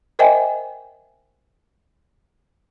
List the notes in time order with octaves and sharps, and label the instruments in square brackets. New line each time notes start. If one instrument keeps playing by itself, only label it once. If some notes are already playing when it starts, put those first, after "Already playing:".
[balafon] A#4 C5 D#5 E5 G5 G#5